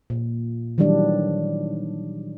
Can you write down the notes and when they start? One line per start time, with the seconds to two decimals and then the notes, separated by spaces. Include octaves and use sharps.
0.10 A#2
0.78 D#3 E3 F#3 G3 D4